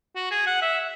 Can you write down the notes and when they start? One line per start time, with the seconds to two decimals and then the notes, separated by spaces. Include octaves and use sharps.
0.16 F#4
0.31 G#4
0.47 F#5
0.62 E5